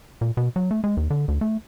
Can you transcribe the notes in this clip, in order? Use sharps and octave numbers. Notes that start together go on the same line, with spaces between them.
A#2
B2
F#3
A3
G#3
D#2
D3
D2
A3